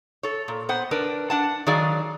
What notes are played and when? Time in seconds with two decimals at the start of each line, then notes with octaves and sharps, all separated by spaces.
0.23 A4 C#5
0.48 A#2
0.69 B3 C5 F#5
0.91 D4 A#4 B4
1.30 D4 F#5 A5
1.67 D#3 F#3 G#4 D5 F5